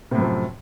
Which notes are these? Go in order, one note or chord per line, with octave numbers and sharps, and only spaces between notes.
F#2 A2 C3 F3